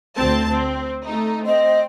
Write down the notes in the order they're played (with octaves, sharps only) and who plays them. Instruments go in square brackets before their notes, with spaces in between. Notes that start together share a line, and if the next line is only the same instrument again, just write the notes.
[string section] D2 C4 A5
C4
A3 D#4
[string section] C4 [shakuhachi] D#5